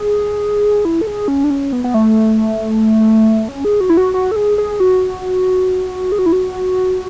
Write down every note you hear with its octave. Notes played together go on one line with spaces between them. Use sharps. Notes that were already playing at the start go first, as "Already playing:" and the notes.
Already playing: G#4
E4
A4
G#4
C#4
D4
C#4
B3
B3
A3
C#4
G#4
F#4
E4
F#4
F#4
A4
G#4
G#4
F#4
G#4
F#4
E4
F#4